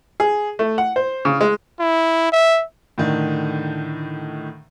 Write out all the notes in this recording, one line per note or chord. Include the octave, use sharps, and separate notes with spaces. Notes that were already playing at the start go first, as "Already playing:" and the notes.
G#4
A3
F#5
C5
C#3
G#3
E4
E5
A2 D3 D#3